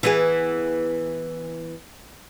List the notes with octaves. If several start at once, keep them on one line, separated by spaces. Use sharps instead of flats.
E3 B3 G#4